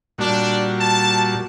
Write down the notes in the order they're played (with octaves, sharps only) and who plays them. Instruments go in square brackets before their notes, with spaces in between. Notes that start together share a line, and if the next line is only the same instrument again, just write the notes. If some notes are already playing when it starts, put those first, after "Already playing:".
[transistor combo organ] A#2 G3 F#4 [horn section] D4
[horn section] A5